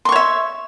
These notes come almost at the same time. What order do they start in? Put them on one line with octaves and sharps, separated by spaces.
C6 C#6 C#5 E5